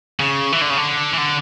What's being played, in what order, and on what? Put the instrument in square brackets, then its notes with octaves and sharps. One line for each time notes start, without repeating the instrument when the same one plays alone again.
[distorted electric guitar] C#3
E3
D3
C#3
D3
E3
D3